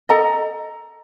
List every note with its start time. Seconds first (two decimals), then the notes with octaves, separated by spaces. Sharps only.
0.09 A4 D#5 A#5